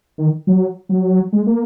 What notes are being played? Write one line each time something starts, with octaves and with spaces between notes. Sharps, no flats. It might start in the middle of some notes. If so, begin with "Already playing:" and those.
D#3
F#3
F#3
G#3
A#3